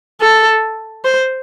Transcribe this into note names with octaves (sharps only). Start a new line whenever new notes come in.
A4
C5